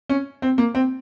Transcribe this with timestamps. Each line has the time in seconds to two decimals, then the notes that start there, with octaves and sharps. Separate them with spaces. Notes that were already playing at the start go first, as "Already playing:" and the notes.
0.10 C#4
0.42 C4
0.58 A#3
0.75 C4